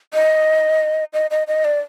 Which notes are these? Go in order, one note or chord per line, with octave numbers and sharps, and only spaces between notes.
D#5
D#5
D#5
D#5
D5